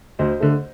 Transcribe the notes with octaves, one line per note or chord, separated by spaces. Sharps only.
D2 C5 D#5
D3 A3